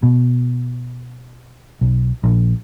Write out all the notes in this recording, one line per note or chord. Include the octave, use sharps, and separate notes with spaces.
B2
B1
A#1